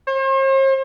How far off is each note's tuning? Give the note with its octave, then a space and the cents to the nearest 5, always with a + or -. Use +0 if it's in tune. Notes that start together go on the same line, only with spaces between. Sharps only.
C5 +45